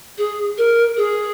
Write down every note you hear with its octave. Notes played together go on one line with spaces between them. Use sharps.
G#4
A#4
G#4